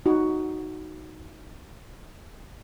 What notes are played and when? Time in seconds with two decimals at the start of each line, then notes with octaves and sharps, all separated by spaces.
0.06 D#4 F#4